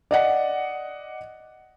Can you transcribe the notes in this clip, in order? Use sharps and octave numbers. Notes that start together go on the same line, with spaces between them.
D5 D#5 F#5